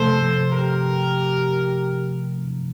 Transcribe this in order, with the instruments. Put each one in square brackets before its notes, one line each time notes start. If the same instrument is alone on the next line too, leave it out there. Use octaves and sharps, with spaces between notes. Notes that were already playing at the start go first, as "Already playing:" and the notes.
Already playing: [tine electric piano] C3 F3 A3 [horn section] A4 C5
[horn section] G4 A#4